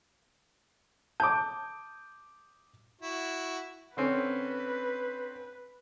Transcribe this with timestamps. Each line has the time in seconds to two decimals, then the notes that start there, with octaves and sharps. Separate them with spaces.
1.20 A5 D6 D#6 G6
3.01 E4 F#4
3.97 D3 C4 C#4 B4